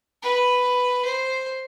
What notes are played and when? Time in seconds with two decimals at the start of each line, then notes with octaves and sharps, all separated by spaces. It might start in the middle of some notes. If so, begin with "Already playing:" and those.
0.23 B4
1.04 C5